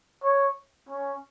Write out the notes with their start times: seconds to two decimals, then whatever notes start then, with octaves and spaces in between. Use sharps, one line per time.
0.24 C#5
0.89 C#4